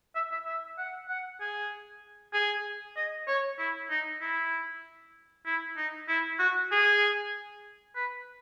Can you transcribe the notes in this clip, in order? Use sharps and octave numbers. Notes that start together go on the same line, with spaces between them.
E5
E5
E5
F#5
F#5
G#4
G#4
D#5
C#5
E4
D#4
E4
E4
D#4
E4
F#4
G#4
B4